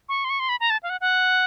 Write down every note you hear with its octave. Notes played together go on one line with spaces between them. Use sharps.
C#6
C6
C#6
C6
B5
A#5
A5
F5
F#5
F#5